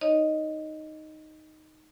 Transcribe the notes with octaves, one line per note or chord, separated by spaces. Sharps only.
D#4 C#5 D#5